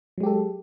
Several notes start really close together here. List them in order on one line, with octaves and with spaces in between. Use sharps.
F#3 G#3 G4 A4